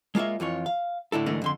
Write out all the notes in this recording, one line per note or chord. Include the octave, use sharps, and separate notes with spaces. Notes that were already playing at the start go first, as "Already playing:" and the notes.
G#3 A#3 F4 C#5 E5
F2 E3 F4 C#5
F5
A2 D3 E4 A4
D2 G#2 E3 A3 D4 A#4
F2 D3 C6